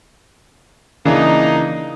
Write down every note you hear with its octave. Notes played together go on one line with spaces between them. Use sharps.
C#3 E3 A#3 D4 D#4